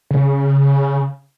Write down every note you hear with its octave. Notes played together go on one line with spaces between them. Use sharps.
C#3